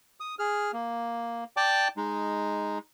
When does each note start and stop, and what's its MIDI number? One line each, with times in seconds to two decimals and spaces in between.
0.20 0.35 87
0.39 0.71 68
0.39 0.71 89
0.73 1.44 58
1.57 1.88 74
1.57 1.88 79
1.57 1.88 81
1.57 1.88 86
1.97 2.78 56
1.97 2.78 63